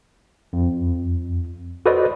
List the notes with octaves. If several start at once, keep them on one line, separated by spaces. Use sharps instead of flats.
F2
F#4 A4 B4 C5 D5 D#5